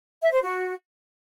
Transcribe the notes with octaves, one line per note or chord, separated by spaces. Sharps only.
E5
C5
F#4